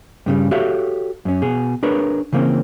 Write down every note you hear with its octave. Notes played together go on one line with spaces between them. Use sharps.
G2 C#3 G3
F#4 G4 A4 C#5 E5 F5
F#2 C#4
B2 G#4
D4 G#4 A#4 B4 C#5
C#3 E3 A#3 C4